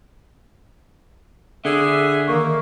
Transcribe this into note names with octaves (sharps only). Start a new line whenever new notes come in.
D3 G#4 E5
D#3 E3 A#3 C#6